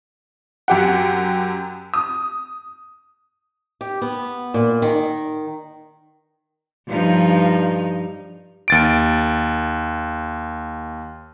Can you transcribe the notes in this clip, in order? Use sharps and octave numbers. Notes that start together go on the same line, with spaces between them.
F#2 G4 F#5
D#6
G4
B3
A#2
D#3
G2 F3 D#4
D#2 A6 D7